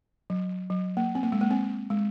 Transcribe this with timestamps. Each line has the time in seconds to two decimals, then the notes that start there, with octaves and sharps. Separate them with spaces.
0.30 F#3
0.70 F#3
0.97 A#3
1.15 C4
1.23 A#3
1.32 G#3
1.41 A#3
1.51 C4
1.90 G#3